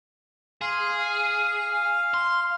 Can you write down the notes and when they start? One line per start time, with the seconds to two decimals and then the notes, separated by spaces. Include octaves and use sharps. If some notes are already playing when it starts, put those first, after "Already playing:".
0.61 G#4 F5 C6
0.98 F5
2.14 C6